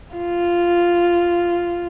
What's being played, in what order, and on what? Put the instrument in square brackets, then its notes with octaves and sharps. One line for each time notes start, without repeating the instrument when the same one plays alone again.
[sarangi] F4